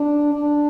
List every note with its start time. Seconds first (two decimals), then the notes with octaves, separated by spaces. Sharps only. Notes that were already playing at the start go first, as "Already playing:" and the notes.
Already playing: D4
0.33 D4